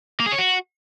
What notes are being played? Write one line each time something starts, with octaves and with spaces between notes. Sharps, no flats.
A#3
G#4
C#5
F#4